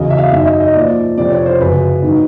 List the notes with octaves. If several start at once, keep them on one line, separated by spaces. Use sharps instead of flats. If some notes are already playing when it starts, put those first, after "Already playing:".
Already playing: E2 C#3 F#3 D#5
E5
F5
F#2 D#3 F#3 E5
D#5
E5
D#5
A#2 F3 D5
F2 C3 F3 D5
C#5
C5
F#2 C#3 F#3 B4
G#2 D#3 F#3